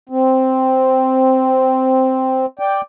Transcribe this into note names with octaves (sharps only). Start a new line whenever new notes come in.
C4
D5 G5